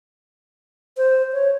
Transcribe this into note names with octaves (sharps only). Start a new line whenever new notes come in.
C5
C#5